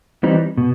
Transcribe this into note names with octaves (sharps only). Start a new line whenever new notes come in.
E3 G3 C4 D#4
B2